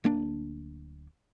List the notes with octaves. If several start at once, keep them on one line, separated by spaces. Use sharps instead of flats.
D1 A#3 D4